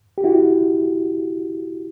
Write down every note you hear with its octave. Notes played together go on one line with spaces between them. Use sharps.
G4
E4 F#4